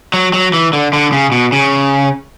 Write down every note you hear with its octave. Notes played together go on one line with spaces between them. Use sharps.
F#3
F#3
E3
D3
D3
C#3
B2
C#3